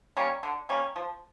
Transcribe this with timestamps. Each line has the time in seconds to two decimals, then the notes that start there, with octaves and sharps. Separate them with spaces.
0.17 G3 A#3 C#4
0.43 D3
0.69 G3 A#3 C#4
0.96 F3